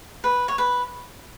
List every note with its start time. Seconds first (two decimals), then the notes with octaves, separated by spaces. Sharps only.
0.24 B4
0.48 C#5
0.58 B4